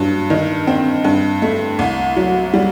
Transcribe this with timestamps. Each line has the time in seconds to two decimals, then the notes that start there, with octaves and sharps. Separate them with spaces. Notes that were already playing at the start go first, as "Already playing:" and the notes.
Already playing: G2 F#3
0.30 D#3
0.67 C4
1.04 G2
1.42 A3
1.79 C2
2.16 F#3
2.53 G3